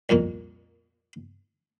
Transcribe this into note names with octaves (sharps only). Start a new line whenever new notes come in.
C2 F2 A#2 A#3